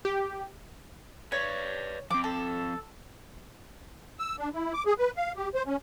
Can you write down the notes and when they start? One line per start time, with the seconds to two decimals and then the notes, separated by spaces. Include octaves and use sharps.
0.05 G4
1.32 B4 C#5 D5
2.11 F3 C4 D6
2.24 A4
4.19 E6
4.38 D4
4.54 E4
4.73 D6
4.86 G#4
4.98 B4
5.17 F5
5.36 G4
5.55 C5
5.66 C#4